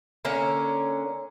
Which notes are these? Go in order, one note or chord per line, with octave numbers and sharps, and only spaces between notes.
D3 A#3 C#4 C#5